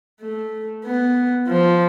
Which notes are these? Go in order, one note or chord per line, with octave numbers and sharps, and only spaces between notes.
A3
B3
F3